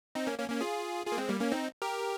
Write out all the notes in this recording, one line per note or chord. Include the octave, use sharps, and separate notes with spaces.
C4 D#4
A#3 C#4
A#3 C#4
A#3 C#4
F4 G#4
F4 G#4
A#3
G#3 C4
G3 A#3
A#3 C#4
C4 D#4
G4 A#4